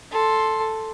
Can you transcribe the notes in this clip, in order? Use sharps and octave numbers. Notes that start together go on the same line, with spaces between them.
A4 C6